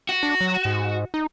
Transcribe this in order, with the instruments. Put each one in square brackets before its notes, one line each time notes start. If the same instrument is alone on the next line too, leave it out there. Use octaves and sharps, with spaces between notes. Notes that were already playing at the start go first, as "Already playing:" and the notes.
[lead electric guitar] F#4
[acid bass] D4
F#3
G#2
D#4